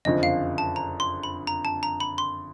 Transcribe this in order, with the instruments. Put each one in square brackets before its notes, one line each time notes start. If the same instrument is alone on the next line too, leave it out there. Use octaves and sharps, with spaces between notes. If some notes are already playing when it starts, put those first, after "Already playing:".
[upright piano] F#1 F2 D3 F3 [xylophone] D#5
[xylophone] F5
A5
A#5
C6
B5
A#5
A5
A#5
B5
C6